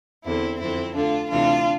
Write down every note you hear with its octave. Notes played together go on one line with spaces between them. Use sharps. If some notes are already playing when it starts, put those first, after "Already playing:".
E2 D3 C4 E4
F2 D3 C4 E4
D2 D3 D4 F4
D2 C3 E3 D4 F4